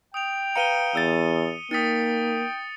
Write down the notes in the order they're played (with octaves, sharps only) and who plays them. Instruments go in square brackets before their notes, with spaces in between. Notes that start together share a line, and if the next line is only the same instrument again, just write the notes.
[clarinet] G5 [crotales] D#6 F7
[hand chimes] B4 F5 A#5 [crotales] C#7 D#7 G7
[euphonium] E2 [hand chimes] E6 A6
[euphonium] A#3 [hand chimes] D#4 B6 [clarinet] G5 [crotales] D#6 A6 C#7